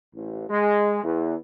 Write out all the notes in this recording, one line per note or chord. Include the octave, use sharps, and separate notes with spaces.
A1
G#3
E2